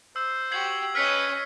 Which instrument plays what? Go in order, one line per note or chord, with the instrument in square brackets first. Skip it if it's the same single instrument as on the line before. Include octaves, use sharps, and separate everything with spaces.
[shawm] C5 [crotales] E6
[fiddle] F#4 G4 [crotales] G#6 C7 F#7
[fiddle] C#4 D#5 [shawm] B4 [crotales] F6 B6 C#7